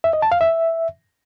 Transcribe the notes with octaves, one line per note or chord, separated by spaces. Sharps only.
E5
D#5
A5
F5
E5